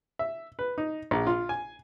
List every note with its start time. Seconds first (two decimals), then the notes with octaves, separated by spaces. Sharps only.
0.19 E5
0.59 B4
0.78 D#4
1.11 A#1
1.27 F4
1.49 G#5